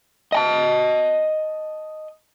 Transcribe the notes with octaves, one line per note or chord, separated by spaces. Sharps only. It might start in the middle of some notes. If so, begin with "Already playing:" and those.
D#5 G#5 A5